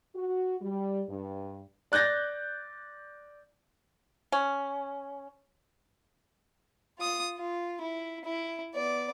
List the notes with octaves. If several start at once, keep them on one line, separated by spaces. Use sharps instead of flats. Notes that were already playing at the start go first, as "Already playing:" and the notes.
F#4
G3
G2
D5 F#6 G6 A6 A#6
C#4
F4 D#6
F4
E4
E4
B3 D5